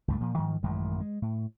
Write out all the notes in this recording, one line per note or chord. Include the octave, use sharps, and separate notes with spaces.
C#2 G2 A3
A#2 F3
G#2 D#3 F3 G#3
A1 F#2 D#3 G#3
G#3
A2